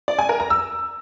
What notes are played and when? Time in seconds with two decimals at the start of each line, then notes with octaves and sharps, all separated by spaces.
0.08 D5
0.19 G#5
0.29 A#4
0.40 A#5
0.50 E6